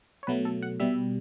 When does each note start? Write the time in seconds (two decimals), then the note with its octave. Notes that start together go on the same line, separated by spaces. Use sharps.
0.23 C#5
0.27 B2 F#3 A3 B4
0.45 A4
0.62 F#5
0.80 B2 G3 E5